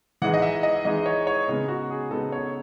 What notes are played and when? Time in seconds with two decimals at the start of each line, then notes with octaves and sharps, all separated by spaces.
0.22 E3 G#3 D#4 F#5
0.34 D#5
0.42 E5
0.63 D#5
0.85 E3 G#3 D#4 D#5
1.06 C#5
1.27 C#5
1.48 C#3 G#3 B3 D#4
1.68 F#4
1.90 G#4
2.11 C#3 G#3 B3 D#4 A4
2.32 C#5